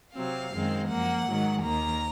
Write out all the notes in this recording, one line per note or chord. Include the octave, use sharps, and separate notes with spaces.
C3 F#3 C4 F5
F#2 D#3 G#3 C4
F#2 F3 A#3 F#5
G#2 D#3 F#3
D#2 D#3 A#3 A#5